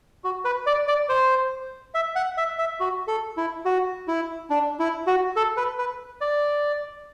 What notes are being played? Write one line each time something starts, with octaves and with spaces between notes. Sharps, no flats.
F#4
B4
D5
D5
C5
E5
F#5
E5
E5
F#4
A4
E4
F#4
E4
D4
E4
F#4
A4
B4
B4
D5